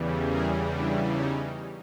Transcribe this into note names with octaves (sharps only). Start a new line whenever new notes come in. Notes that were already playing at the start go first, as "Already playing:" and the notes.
Already playing: E2 C#3 E3 G3
G#4 A#4
D4 E4
C#4 D#4